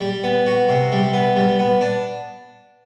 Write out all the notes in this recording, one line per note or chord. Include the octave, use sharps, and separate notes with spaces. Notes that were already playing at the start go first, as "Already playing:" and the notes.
G3
B3
F#4
C3
G3
B3
G3
B3
D4